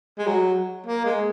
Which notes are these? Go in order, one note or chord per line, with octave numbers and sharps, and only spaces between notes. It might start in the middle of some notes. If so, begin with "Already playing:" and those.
G#3
F#3
A#3
G#3